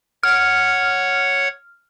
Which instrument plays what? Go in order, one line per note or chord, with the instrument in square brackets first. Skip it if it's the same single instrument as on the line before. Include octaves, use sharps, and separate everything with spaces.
[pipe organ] C#5 F#5 [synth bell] F6